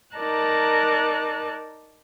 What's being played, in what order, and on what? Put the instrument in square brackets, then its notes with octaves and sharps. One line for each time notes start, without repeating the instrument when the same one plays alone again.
[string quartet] D#4 A#4 D5 A5 F#6